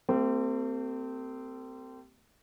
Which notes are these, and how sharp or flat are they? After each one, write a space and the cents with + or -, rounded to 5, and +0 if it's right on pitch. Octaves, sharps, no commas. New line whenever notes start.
A3 +40 C4 -20 G4 -20